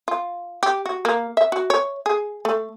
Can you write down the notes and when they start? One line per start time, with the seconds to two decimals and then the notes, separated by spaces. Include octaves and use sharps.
0.08 F4
0.63 G4
0.86 F#4
1.05 A#3
1.37 E5
1.52 F#4
1.70 C#5
2.06 G#4
2.45 A3